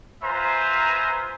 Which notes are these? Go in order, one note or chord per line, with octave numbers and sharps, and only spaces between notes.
F4 B4 C5 E5 G#5 A#5